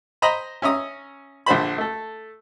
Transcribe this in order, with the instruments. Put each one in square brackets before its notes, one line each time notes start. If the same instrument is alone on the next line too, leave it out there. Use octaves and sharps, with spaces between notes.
[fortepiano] C5 D#5 A#5 B5
C#4 E5 A#5 D#6
A#1 D3 C5 B5
A3 A4